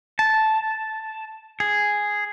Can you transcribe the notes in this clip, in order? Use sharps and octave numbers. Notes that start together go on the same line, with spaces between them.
A5
G#4